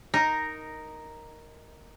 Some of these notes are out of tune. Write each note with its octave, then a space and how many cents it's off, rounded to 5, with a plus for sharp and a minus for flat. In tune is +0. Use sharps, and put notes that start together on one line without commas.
D#4 +0 A#4 +0